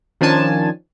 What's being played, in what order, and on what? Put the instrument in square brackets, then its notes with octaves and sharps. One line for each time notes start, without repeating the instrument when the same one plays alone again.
[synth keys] D#3 F3 C#4 D4 G#5 A5